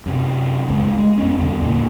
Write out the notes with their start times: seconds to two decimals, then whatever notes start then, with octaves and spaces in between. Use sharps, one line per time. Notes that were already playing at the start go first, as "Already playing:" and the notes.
0.06 F#2 C3
0.68 F#1 C#2 G#2
0.98 G#3
1.18 F2 B3 C#4
1.38 E2 G2 D3
1.61 D#2 A2 C#3 A#3